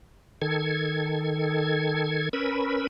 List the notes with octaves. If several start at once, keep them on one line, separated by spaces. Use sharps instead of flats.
D#3 A4 G#6
C#4 A#4 B4 B5 E6